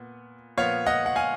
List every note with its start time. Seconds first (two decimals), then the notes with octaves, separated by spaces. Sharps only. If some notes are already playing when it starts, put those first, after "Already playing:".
Already playing: A#2 B3
0.57 A#2 F3 B3 C#5 F5
0.86 D#5 F#5
1.06 F#5
1.16 F5 G#5